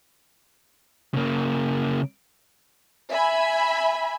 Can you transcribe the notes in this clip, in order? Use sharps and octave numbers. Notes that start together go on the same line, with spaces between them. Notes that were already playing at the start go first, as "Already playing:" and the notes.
C#3 A#3
E5 G#5 B5